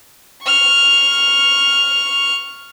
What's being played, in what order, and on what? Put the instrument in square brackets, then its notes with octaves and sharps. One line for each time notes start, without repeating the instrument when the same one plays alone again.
[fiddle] C#6 F6